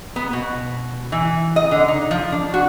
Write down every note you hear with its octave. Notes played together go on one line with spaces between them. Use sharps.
B3
B2
E3
D#5
D3
D#4
F3
D4
F#4